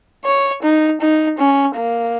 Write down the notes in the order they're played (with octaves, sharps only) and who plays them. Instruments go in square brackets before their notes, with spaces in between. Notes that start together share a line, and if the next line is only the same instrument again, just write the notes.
[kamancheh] C#5
D#4
D#4
C#4
A#3